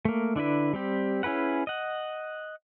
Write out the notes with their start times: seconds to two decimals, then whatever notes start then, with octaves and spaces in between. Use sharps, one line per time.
0.05 A3 A#3
0.36 D3 D4 E4 B4
0.73 G3 C4 G4
1.23 C#4 E4 G#4 B4 F#5
1.67 D#5 F#5